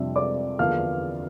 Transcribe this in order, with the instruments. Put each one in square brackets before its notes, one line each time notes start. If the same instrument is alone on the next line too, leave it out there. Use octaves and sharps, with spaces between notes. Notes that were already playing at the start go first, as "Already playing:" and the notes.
Already playing: [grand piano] F2 C3 G3 D4 F4 [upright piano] E5
[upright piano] D5 D6
[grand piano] E2 D3 F3 A#3 D4 [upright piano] F5 F6